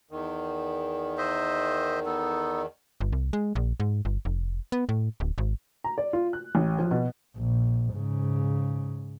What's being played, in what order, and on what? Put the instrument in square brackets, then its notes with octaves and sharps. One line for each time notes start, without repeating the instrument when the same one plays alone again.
[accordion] E2 D#3
[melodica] C5 D#5 E5
B3 D#4 A4
[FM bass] G1
C2
G#3
A#1
G#2
G1
F1
B3
A2
D1
G#1
[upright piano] A#5
D5
F4
F#6
A1
F3
B2
[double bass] A#1
G#2 C#3